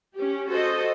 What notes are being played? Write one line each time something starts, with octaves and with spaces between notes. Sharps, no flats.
C#4 G4
F#4 A4 C5 D#5